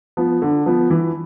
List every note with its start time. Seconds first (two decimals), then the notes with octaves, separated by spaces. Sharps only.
0.17 F3 B3
0.42 D3
0.66 F3 B3
0.90 E3